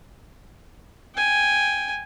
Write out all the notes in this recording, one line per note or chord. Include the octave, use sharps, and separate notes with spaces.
G5 G#5